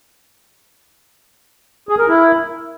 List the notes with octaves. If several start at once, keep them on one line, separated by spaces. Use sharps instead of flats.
G#4
A#4
E4